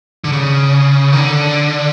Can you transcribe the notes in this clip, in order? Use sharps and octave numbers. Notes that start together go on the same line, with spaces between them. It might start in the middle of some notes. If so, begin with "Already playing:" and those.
D3
C#3
D#3
D3